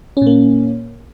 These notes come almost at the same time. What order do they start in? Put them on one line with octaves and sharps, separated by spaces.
C#4 A#2 A#3